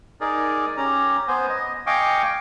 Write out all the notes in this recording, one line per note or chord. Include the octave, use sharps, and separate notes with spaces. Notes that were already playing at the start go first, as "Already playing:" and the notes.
D#4 G#4 A#4 D5
C#4 G4 A#5
B3 C5 G#5
D#5
D#5 F5 G5 G#5 C#6 D6